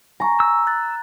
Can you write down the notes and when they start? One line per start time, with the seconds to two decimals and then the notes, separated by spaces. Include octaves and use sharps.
0.20 G#5 A#5 C#6
0.40 E6
0.67 F#6 A6